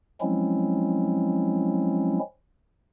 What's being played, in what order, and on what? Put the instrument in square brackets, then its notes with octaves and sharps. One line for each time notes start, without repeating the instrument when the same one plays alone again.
[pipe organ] F3 F#3 G#3 C4 C#4 E4